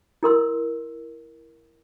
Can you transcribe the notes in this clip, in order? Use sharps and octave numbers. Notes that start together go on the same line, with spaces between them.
E4 A#4 C6 E6